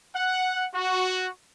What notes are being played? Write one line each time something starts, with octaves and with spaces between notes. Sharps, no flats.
F#5
F#4